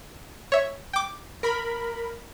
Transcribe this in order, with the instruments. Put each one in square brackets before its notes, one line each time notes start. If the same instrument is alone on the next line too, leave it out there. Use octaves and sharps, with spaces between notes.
[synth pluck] C#5 E5
G5 D6
[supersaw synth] A#4 B5